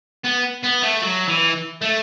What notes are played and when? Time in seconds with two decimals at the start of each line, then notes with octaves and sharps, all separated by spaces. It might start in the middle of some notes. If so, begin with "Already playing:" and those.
0.24 B3
0.63 B3
0.82 A3
1.02 F#3
1.28 E3
1.82 A3